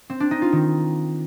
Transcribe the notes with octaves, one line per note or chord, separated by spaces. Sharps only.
C4
D4
D#4
F4
D#3